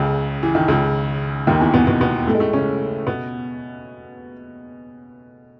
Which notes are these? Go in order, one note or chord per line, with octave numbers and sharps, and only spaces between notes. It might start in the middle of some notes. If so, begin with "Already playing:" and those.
Already playing: C#2 C#3
E3
D#3
C#2 C#3
D#2 D#3
E2 E3
B2 B3
B2 B3
B2 B3
A2 A3
G#3
A2 A3
C#3 C#4
B2 B3